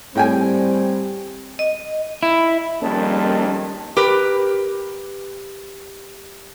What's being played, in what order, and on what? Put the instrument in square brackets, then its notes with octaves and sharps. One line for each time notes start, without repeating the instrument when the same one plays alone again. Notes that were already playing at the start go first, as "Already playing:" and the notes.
[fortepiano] A2 G5 G#5 [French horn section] G3 C4
[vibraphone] D#5
[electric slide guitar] E4
[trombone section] F2 D#3 G#3 [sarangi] G3 [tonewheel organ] A#3 C#4 [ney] A5
[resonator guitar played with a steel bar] G4 A#4 B4